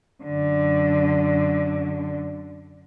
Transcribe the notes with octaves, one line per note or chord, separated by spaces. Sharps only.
F#2 D3